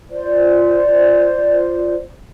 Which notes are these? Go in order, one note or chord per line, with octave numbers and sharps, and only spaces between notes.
F4 C5 D5